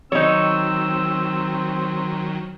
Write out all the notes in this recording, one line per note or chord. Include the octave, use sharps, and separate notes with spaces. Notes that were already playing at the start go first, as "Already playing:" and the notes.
D#3 F#3 C4 D#4 C#5 E6